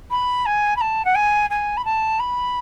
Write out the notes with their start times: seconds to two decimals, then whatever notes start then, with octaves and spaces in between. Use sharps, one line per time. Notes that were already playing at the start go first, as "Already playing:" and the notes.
0.11 B5
0.46 G#5
0.76 B5
0.81 A5
1.05 F#5
1.15 G#5
1.50 G#5
1.77 B5
1.85 A5
2.19 B5